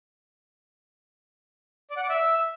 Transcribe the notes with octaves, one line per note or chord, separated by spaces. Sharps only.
D5
F#5
D5
E5